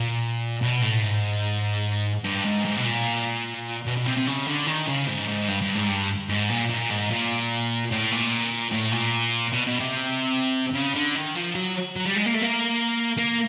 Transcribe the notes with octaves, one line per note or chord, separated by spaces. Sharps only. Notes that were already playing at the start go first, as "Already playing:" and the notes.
Already playing: A#2
B2
A2
G#2
G2
G#2
G#2
B2
A#2
B2
B2
C3
C3
C#3
D3
D#3
C#3
G#2
G#2
G2
G2
G#2
G2
G#2
A#2
A#2
G#2
A#2
A2
A#2
A2
A#2
B2
B2
C3
C#3
D3
D#3
F3
F#3
F#3
G3
G#3
A#3
A3
A#3
A#3